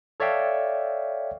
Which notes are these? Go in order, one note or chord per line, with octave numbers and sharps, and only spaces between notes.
A4 C#5 D5 E5 F5 G5